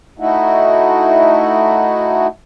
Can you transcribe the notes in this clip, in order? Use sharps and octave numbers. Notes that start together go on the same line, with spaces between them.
A3 D#4 E4 F#4